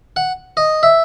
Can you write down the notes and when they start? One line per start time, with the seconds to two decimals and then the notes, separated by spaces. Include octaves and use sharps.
0.16 F#5
0.57 D#5
0.83 E5